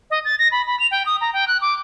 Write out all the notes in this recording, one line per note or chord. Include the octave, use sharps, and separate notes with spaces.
D#5
A6
A#6
B5
B5
F7
G5
D#6
A#5
G5
F#6
D6